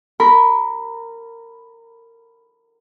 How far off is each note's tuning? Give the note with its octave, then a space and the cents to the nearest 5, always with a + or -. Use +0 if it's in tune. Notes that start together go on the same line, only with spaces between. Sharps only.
A#4 -20 B5 +0